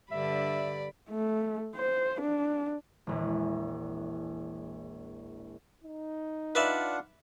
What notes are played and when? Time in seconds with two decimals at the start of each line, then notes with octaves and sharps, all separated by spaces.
0.11 G2 D3 D5 E5 B5
1.10 A3
1.75 C5
2.21 D4
3.07 E1 A#1 E3
5.84 D#4
6.55 D4 F4 B4 D5 E5 F#5